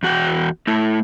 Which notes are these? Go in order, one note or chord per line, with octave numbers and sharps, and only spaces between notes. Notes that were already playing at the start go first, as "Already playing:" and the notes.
E2 F#4 F#5 G5
A3 E4